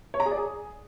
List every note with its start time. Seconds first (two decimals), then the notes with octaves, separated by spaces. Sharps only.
0.14 C#5
0.20 A#5
0.26 G#4
0.32 D5
0.37 G#4